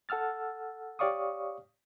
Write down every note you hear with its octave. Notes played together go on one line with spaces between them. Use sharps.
A4 F#5 E6 F6 A6
G4 C#5 D5 F5 C#6 D#6